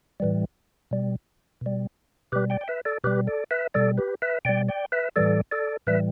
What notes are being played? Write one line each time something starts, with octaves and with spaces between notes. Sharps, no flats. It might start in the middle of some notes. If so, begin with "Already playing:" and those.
A2 E3 G3
B2 G3
B2 G3
B2 G3 G4 B4
D5 G5
G5
B4 E5
A4 D5
B2 G3 G4 B4
A4 D5
B4 E5
B2 G3 A4 D5
G4 B4
B4 E5
B2 G3 D5 G5
D5 G5
B4 E5
A2 E3 G3 A4 D5
A4 D5
A2 E3 G3 B4 E5